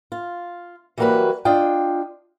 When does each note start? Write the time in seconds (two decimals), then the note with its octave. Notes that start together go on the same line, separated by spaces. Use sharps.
0.12 F4
0.98 E3 F#3 G3 A#3 F#4 B4
1.45 D4 F4 D#5 G5